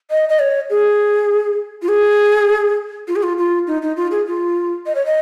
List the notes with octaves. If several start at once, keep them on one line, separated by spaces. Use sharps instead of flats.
D#5
D#5
C#5
G#4
F4
G#4
F4
G#4
F4
F4
D#4
D#4
F4
G#4
F4
D#5
C#5
D#5